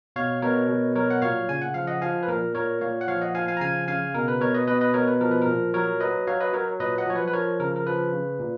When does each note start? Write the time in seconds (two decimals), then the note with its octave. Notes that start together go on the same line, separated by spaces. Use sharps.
0.16 B2 C#5 F5
0.42 B2 A#4 C#5
0.69 B2
0.96 F#3 A#4 C#5
1.10 F#5
1.22 A#2 C#5 F5
1.49 C#3 G#5
1.62 F#5
1.74 F3 F5
1.87 D#5 F#5
2.02 F3 F5 G#5
2.23 B4
2.28 A#2 A#4
2.55 A#2 A#4 C#5
2.81 A#2 C#5 F5
3.01 F#5
3.08 F3 C#5 F5
3.21 D#5 F#5
3.35 F3 F5 G#5
3.48 F5 G#5
3.57 A#5
3.61 C#3 F5 G#5
3.88 C#3 F5 G#5
4.14 B2 A#4
4.28 B4
4.41 B2 A#4 C#5
4.54 B4 D#5
4.68 B2 B4 D#5
4.81 B4 D#5
4.94 B2 A#4 C#5
5.08 B4
5.21 F3 A#4
5.31 B4
5.42 A#4
5.47 A#2
5.74 F#3 A#4 C#5
6.00 F#3 B4 D#5
6.27 F#3 C#5 F5
6.40 B4 D#5
6.53 F#3 A#4 C#5
6.80 A#2 B4 D#5
6.98 D#5 F#5
7.07 F3 C#5
7.16 B4
7.28 B4
7.33 F3 A#4 C#5
7.60 C#3 A#4
7.76 A#4
7.87 F3 B4
8.13 C#3
8.39 A#2